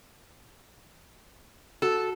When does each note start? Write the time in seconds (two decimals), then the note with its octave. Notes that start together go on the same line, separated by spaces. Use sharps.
1.82 F#4 A4